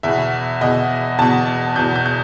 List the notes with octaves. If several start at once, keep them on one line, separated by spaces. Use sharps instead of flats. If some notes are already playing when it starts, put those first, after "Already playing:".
E2 B2 E5
E2 B2 D#5
E2 B2 A5
E2 B2 G6
G6
G6